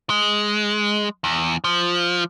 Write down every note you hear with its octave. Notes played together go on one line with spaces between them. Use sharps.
G#3
E2
F3